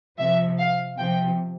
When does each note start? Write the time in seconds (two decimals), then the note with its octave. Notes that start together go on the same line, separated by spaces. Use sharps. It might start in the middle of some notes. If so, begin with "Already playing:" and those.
0.18 C3 F3 E5
0.58 F5
0.98 C3 F3 G5